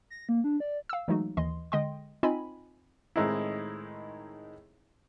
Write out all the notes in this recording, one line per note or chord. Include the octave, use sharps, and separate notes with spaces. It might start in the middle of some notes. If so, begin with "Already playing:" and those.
A#6
A#3
D4
D5
F5 E6
E3 F#3 G#3 A3 D#4 F#4
D#2 E3 D#5 C6
D3 G#3 D#5 G5 C6
C4 D#4 F4 D#5 G#5 B5
A2 D#3 G#3 C4 D#4 E4